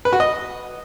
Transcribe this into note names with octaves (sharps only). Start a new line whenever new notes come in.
B4
F#4
D#5